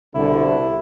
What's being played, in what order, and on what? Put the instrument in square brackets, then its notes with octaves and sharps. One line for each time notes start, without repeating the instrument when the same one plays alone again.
[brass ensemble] C2 B2 D3 [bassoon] E4